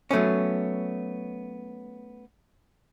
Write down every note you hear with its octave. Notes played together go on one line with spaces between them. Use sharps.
F#3 A3 B3 C#4